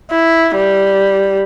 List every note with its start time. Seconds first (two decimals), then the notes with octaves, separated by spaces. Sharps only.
0.11 E4
0.56 G3